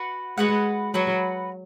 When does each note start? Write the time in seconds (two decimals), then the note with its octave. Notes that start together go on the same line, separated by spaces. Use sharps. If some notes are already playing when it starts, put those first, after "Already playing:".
Already playing: F#4 B4 F#5
0.37 G#3 F#4 B4 F#5
0.94 F#3 F#4 B4 F#5